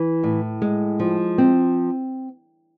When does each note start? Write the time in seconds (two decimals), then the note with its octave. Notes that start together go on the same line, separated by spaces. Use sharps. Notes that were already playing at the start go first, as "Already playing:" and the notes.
Already playing: E3
0.23 A2
0.62 G#3
1.00 F3
1.38 C4